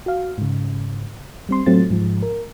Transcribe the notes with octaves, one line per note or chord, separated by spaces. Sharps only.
F#4 F5
G#2 C#3
G3 C4 C6
A2 F#3 A3 C4 F4 A6
G#2 F3 G#3
A#4